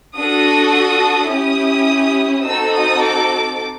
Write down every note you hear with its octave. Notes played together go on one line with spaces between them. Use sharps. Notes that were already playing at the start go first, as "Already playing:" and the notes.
D4 F#4 A4 D#6
C#4 E4 G4 D#6
C4 D#4 F#4 A4 E6
D#6
D6